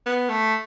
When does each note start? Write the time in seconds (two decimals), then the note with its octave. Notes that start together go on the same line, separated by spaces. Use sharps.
0.06 B3
0.30 A3